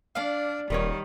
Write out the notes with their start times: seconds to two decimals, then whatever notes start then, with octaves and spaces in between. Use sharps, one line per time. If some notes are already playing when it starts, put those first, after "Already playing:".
0.15 D4 D5 F5
0.70 D#1 D#3 G3 A#4 C#5